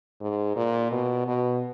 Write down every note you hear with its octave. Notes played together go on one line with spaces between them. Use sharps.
G#2
A#2
B2
B2